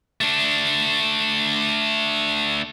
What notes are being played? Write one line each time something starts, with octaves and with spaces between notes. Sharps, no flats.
A3 D4